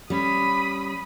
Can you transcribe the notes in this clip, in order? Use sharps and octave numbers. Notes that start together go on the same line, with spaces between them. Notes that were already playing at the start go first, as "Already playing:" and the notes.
G3 C#4 B5 D#6